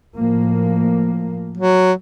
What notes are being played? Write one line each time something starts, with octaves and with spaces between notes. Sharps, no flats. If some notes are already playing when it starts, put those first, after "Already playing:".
A2 F3 A#3
F#3